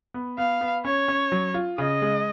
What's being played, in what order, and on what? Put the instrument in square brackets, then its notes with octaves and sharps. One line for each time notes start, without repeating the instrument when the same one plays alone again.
[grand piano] B3
[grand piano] B3 [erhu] F5
[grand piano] B3
[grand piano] C#4 [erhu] C#5
[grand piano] C#4
F#3
F4
[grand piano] C#3 [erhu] D#5
[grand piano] G#3